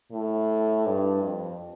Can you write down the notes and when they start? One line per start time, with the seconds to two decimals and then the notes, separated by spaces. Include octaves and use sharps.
0.12 A2
0.86 G2
1.23 F2